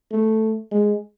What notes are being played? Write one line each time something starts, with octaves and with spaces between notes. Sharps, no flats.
A3
G#3